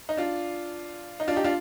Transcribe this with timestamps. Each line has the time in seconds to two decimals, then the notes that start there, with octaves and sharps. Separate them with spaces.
0.09 D#4
0.17 D4 F4
1.20 D#4
1.28 D4 F4
1.36 D#4 G4
1.44 D4 F4